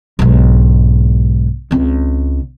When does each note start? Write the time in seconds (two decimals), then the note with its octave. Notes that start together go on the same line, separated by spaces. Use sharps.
0.19 B1 G#2
1.71 C#2 C4